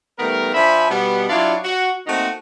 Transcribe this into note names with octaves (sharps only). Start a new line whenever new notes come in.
D#3 G3 A3 B3 A#4
F3 D4 C5 E5 G#5 B5
B2 G3 B3
F#3 D4 E4 F4 C#5 D5
F#4
A3 A#3 C4 D#4 F#4